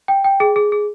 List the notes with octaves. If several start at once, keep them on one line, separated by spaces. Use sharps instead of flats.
G5
G5
G#4
G#4
G#4